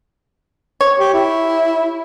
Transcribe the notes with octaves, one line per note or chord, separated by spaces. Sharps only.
C#5
G4
E4